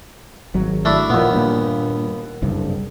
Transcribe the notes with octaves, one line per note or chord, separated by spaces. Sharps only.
G#1 F#3
A3 D4 E4
D#2 A#2 F3 B3
G2 A#2
F#1 C2 G2